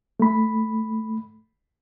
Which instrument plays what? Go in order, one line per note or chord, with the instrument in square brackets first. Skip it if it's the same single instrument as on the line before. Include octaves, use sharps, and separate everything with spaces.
[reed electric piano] A3 B5